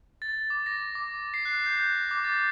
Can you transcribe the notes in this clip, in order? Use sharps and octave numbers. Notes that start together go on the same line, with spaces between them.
A6
D6
A#6
D6
C7
F#6
G6
F#6
D6
A6